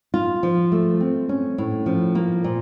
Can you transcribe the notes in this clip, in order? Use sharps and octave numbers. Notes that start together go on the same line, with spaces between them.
F4
F3
A3
C4
C#4
A2
F3
A#3
A#2